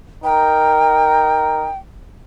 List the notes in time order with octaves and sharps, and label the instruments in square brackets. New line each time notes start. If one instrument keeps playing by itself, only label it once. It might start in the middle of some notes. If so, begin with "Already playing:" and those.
[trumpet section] D#4 A#4 [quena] G5